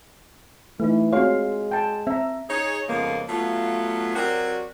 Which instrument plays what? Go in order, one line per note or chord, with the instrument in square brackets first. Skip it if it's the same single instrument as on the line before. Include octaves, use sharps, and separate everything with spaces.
[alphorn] E3 [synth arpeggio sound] A3 D#4
[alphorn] G#3 [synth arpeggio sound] C4 F#4 C#5 [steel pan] F4 F5 C6
[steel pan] G5 A5
[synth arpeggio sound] C4 [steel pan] E5 A#5
[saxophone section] D#4 G#4 C#5
F2 C#3 F3 G#3 A#3 B3
F#3 A3 B3 F4
F#3 C4 F#4 G4 A#4 D5